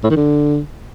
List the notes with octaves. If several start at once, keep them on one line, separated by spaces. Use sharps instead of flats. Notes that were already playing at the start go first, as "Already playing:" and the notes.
A2
D#3
D3